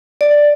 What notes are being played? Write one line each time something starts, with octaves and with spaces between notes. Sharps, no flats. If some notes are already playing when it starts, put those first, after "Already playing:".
D5